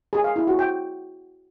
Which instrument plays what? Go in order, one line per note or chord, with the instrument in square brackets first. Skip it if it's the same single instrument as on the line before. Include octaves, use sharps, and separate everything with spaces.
[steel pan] G#4
F5
E4
F#4
G5